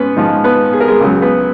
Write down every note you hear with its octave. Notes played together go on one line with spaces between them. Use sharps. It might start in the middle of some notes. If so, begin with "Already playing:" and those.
Already playing: G#2 B3 C#4 B4
G#2 F3 D#4
B3 B4
G#4
A#4
G#3 G#4
C#2 C#3 F#3
B3 B4